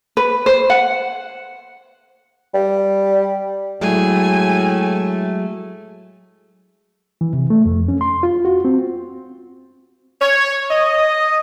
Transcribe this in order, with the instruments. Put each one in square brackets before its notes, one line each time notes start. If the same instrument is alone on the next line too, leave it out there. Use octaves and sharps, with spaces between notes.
[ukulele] B4
C5
F#5
[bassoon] G3
[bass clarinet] A2 [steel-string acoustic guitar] F#3 G#3 [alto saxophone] A3 [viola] G#5
[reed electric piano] E3
C3
A3
F2
C#4
C6
F4
F#4
C4
[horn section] C#5
D#5